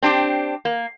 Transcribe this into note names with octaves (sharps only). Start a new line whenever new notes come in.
C4 D4 G4
A#3